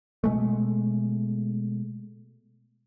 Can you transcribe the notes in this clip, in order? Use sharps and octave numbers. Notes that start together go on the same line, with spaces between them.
B2 G#3 A3